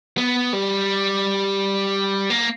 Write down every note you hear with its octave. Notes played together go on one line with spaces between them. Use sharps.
B3
G3
A#3